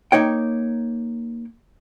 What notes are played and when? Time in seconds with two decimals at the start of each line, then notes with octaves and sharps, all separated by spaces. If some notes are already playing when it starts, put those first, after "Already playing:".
0.12 A#3 D#4 C#5 G5